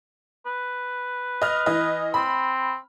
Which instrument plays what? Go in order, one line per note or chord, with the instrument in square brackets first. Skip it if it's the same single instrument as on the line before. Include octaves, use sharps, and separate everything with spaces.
[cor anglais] B4
[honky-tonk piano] D#5 F6
E3 D#5
[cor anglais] C4 [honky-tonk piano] B5